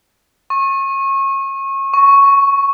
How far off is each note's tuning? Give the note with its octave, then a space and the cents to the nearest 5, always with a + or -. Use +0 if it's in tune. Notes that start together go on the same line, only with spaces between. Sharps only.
C#6 -30
C#6 +0